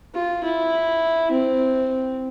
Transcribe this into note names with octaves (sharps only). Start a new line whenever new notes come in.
F4
E4
C4